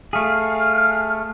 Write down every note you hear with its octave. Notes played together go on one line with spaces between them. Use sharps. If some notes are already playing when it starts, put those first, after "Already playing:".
A3 G#4 F5 F6